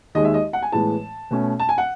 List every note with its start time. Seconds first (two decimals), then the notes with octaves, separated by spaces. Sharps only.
0.15 D#2 D#3 G#3 D#5
0.25 E5
0.34 D#5
0.53 F#5
0.62 G#5
0.72 A2 E3 G#3 B3 A5
1.31 B2 A3 C#4
1.60 A5
1.69 G#5
1.78 F#5